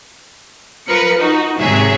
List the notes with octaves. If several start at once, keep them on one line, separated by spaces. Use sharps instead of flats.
F3 A#4 B4 C#7
D#4 F#4
G#1 G#2 C3 F#3 G#4 E5